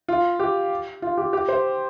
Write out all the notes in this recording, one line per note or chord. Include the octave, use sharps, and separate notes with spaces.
F4
G4
F4
G4
G4
C5